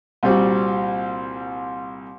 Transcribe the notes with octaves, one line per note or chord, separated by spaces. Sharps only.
C2 A#2 G3 C4 F#4